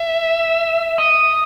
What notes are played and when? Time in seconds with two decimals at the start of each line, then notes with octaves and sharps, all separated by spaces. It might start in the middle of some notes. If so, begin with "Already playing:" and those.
Already playing: E5
0.98 D#5